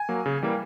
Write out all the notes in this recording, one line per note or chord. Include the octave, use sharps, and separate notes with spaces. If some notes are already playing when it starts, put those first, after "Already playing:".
Already playing: G#5
F#3 A#3
C#3
E3 G3 A#3